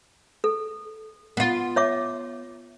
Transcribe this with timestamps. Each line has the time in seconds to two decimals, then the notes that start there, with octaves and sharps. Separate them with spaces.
0.44 A4
1.37 B3 F4
1.76 C#5 E5 D6